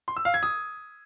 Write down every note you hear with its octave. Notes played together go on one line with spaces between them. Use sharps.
C6
E6
F5
G#6
D#6